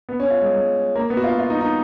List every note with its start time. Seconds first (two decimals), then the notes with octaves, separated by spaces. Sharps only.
0.09 B3
0.20 C#4
0.30 F4
0.41 G#3
0.52 G#3
0.95 A#3
1.10 B3
1.17 F#4
1.24 F4
1.39 F4
1.50 D#4
1.61 D#4